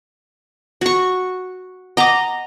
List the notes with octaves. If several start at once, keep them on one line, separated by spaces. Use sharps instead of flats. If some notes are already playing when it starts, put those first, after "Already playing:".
F#4 C#6
D#5 F#5 A#5 D6